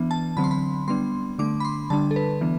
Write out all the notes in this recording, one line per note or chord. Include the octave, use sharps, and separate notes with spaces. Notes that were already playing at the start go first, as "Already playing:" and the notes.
Already playing: E3 B3 D4
A5
D3 F#3 C4 B5
C6
B5
G3 B3 D4 C6
D3 A3 D4 D6
B5
C6
D3 G3 D4 A5
A4
B4
E3 B3 D4